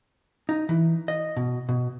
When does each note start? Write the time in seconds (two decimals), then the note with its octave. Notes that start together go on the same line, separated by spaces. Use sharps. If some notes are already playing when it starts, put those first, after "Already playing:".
0.49 D#4
0.69 E3
1.08 D#5
1.37 B2
1.69 B2